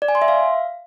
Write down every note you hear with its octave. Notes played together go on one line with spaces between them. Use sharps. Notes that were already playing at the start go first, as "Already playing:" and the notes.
D5
G#5
C6
E5
F5